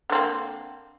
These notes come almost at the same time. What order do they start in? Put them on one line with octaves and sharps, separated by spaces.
D3 C4 A#3